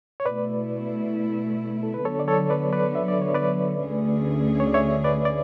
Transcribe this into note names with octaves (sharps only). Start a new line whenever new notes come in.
C#5
B2 A3 E4 B4 D5
A4
B4
D3 F#3 B3 A4 C#5
D5
A4 C#5
B4 D5
B4 D5
E5
D5
C#5
B4 D5
D2 D3 A3 C#4 G#4
C#5
D5
C#5 E5
B4 D5
D5